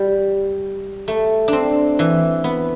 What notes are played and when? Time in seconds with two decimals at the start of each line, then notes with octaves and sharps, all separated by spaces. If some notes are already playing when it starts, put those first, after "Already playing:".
Already playing: G3
1.08 A3
1.48 C4 D4
1.99 E3
2.44 B3